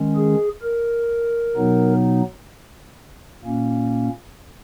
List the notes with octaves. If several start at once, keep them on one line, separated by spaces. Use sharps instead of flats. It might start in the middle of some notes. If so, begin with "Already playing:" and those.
Already playing: D#3 G#3 C#4
G#4
A#4
B2 F#3 B3 D#4
A#2 A#3 C#4